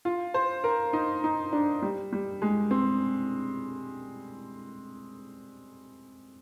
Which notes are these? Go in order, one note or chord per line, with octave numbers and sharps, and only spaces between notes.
F4
C5
A#4
D#4
D#4
D4
G3
G3
G#3
C4